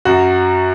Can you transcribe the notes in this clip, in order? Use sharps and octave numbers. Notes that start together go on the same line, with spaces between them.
F#2 F#4